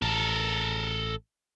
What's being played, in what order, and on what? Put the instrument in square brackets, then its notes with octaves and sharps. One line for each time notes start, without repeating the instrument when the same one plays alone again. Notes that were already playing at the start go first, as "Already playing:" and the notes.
[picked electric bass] A1 [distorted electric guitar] A4 A#4